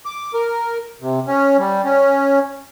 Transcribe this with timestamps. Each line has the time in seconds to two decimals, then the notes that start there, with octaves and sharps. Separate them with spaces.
0.05 D6
0.34 A#4
1.02 C3
1.27 C#4
1.59 G3
1.84 C#4